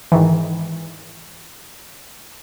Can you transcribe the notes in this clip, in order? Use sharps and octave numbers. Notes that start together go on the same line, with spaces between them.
G#2 D#3 E3